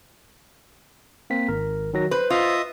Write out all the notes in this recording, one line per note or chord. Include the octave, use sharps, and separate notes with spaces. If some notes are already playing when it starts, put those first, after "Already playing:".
A#3 C4 B6
G#1 A#4
D#3 F#3 A#6
B4 C5
F4 D#5 E5 D#6